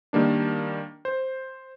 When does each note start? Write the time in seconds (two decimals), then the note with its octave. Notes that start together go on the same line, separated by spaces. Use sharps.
0.13 D#3 G3 A#3 D4
1.05 C5